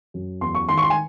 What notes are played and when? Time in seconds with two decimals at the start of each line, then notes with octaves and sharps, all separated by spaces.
0.14 F#2
0.41 E2 C6
0.55 C#6
0.69 D#3 C6
0.78 C#6
0.82 C6
0.90 G#5